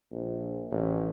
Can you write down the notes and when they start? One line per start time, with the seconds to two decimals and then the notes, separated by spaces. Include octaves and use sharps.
0.12 A#1
0.71 A1